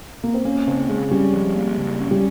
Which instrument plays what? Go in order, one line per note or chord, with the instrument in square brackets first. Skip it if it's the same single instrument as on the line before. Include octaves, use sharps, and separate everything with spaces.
[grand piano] A#3
C4
[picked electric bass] A#3 [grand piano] C#4
[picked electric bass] C#3 [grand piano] C4
[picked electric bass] C#3 [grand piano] G#3
[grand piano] G3 [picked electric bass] C#4
[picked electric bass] F3
A#3
C#3
C#4
[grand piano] G3